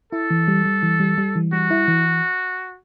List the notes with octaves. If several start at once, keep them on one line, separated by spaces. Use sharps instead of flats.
E4 A4
E3
G3
G3
E3
G3
G3
E3
G3 F#4
E4
E3